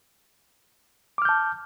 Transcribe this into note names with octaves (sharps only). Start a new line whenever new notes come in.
A5 D6 F6 G6